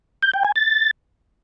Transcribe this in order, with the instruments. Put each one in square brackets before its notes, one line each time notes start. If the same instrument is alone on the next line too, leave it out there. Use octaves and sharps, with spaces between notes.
[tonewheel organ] G6
G5
G#5
A6